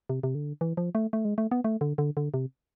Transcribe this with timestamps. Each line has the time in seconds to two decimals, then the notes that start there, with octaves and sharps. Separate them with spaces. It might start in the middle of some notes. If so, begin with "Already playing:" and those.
0.09 C3
0.23 C3
0.35 D3
0.61 E3
0.77 F3
0.95 A3
1.13 A3
1.25 G#3
1.38 A3
1.51 B3
1.64 A3
1.81 D3
1.98 D3
2.17 D3
2.34 C3